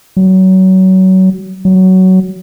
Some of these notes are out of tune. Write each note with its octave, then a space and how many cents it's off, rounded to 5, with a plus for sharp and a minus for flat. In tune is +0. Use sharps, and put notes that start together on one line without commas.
F#3 +25
F#3 +15